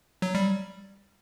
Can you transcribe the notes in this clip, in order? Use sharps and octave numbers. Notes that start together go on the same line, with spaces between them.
F#3
G3